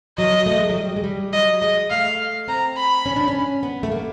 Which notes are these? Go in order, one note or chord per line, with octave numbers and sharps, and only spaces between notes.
F#3 D#5
A3
G#3
F#3
G3
G#3
G3
F#3 D#5
G#3 D#5
A3 F5
C4 A#5
B5
C#4
D4
C#4
B3
A3
A#3